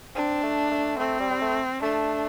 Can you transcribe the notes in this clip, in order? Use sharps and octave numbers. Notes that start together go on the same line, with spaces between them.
C4 D4
A3
A3
A3 C4
G3
G3
A3
A3 D4